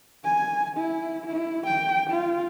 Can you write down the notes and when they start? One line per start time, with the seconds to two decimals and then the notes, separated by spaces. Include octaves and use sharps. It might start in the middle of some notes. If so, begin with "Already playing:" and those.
0.24 G#5
0.77 E4
1.27 E4
1.66 G5
2.10 F4